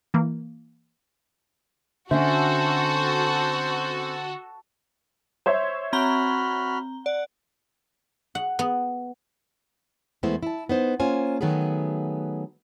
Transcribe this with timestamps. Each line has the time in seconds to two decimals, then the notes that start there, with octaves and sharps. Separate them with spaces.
0.14 E3 A#3
2.11 D3 C4 C#4 F#4 A4 C5 E5
5.46 C5 C#5 E5
5.93 C4 F#4 A#5 B5 F6 G7
7.06 D5 F#5
8.35 F#5
8.59 B3
10.23 E2 G#3 A3 B3 E4 C5
10.43 E4 A5
10.69 B3 D#4 C5
11.00 A#3 C#4 F4 C5 G#5
11.41 D#3 F#3 A3 B3 G#4